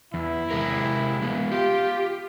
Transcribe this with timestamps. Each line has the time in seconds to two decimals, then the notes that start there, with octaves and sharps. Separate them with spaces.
0.14 E2 E4
0.51 C3 G#3 A#4
1.22 G#3 B3
1.51 F4 G4